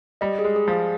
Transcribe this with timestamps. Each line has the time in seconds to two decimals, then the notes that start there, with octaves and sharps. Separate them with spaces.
0.21 G3 D#5
0.39 G#4
0.45 G#3
0.56 G#4
0.68 F3
0.74 G#4